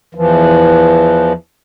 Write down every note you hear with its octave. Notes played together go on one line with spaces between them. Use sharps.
E2 E3 F3